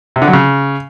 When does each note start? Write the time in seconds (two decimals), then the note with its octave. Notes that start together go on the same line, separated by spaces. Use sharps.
0.16 C3
0.22 D3
0.27 F#3
0.33 C#3